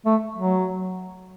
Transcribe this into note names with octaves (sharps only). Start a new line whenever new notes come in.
A3
F#3